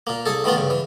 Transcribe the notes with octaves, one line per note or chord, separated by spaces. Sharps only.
A#2 A#3
C2 G#4 A4
D#3 E3 A3 B3 F4
G2 C#3
E3